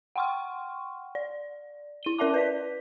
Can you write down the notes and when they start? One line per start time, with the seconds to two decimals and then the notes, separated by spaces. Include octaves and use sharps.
0.16 F#5 G5 C6 C#6 F6
1.15 D5
2.03 E4 D#7 G7
2.18 C#4 A#4 D5 E5 A5 D6
2.34 B4 D5 B6